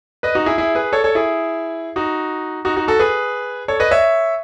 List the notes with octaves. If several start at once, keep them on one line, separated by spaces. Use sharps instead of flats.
B4 D#5
D#4 F#4
E4 G#4
E4 G#4
G#4 B4
A4 C#5
A4 C#5
E4 G#4
D#4 F#4
D#4 F#4
D#4 F#4
F#4 A4
G#4 B4
A4 C#5
B4 D#5
C#5 E5